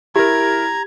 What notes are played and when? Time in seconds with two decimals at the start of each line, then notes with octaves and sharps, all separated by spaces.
0.16 E4 G4 A#4 A#5 G#6